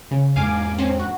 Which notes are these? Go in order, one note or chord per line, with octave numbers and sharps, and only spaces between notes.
C#3
E2 G#2 A#3 F5 G#5 D6
C4 C#4
F#4